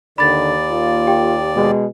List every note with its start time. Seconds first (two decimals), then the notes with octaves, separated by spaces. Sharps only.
0.18 D#2 D3 D#3 D5 B5 A6
0.70 A#3 F4
1.07 G4 G5
1.55 B2 G#3